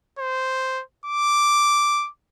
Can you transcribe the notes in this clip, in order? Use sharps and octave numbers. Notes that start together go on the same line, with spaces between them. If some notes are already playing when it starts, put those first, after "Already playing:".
C5
D6